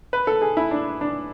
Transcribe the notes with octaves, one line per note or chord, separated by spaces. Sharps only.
B4
A4
G#4
E4
D4
D4